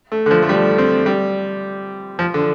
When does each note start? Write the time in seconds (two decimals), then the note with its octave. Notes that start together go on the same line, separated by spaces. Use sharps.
0.12 A3
0.26 D3
0.31 F3
0.42 A3
0.49 G3
0.78 C4
1.06 G3
2.19 F3
2.34 D3